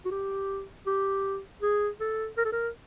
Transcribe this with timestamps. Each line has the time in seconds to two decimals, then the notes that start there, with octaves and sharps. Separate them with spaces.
0.05 F#4
0.11 G4
0.87 G4
1.62 G#4
2.00 A4
2.37 A#4
2.45 A4
2.52 A#4